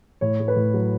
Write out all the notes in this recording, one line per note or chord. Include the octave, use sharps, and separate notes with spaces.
A2 C#5
A3
B4
A2
F#3